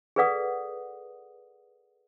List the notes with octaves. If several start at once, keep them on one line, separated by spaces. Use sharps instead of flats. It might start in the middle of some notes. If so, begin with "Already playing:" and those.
G#4 A4 B4 D5 F#5 D#6